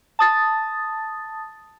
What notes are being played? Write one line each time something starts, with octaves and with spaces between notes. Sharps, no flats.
A5 D#6 A6